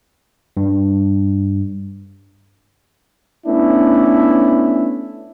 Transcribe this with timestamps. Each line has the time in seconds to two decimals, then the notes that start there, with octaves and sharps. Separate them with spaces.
0.57 G2
3.47 A3 B3 C#4 D4 E4